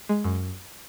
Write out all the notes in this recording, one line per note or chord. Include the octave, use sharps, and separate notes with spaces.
G#3
F#2